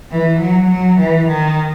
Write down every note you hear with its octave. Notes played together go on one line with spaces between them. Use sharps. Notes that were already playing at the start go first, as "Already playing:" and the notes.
E3
F#3
F#3
E3
D#3